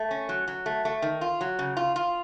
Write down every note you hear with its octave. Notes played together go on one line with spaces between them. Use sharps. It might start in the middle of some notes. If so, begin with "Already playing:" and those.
Already playing: A3
C#4
F#3
F#3
A3
A3
D#3
F4
F#3
C#3
F4
F4